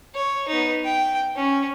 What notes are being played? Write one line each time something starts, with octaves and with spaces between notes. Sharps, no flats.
C#5
B3 D#4
G5
C#4